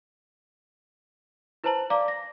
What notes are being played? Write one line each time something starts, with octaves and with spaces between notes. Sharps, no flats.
E4 B4 C5 A5 A#5 F#7
D5 F5 A#5 D6
A#6